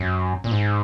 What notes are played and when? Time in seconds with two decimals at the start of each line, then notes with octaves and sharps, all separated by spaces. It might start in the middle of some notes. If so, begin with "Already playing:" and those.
Already playing: F#2
0.44 A#2
0.51 G#2